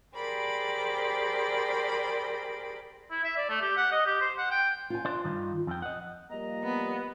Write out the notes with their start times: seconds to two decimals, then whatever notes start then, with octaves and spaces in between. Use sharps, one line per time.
0.15 G4 G#4 A#4 C5 D5 B5
3.11 E4
3.24 E5
3.37 D5
3.49 A3
3.61 G4
3.77 F#5
3.92 D#5
4.06 G4
4.21 C5
4.38 F#5
4.51 G5
4.90 F4 G#5
5.05 D4 C5
5.24 G2 D#3
5.67 F2 G5
5.82 D#5 F#5 G#5
6.30 F3 G3 A#3 D#5 A#5
6.64 B3